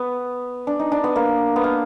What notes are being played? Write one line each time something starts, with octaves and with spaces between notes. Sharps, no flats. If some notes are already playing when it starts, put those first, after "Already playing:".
Already playing: B3
D4
D#4
D4
B3
A#3
B3
A#3